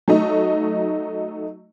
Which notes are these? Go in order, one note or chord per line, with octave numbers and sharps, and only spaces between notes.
F#3 A3 D#4